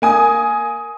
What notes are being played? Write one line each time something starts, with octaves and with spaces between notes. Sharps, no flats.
A#3 G#5 D#6